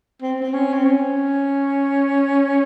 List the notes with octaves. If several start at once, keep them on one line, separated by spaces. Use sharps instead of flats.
C4
C4
C#4
C4
C#4